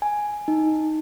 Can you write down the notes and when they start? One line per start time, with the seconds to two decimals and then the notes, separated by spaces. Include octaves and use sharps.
0.02 G#5
0.48 D#4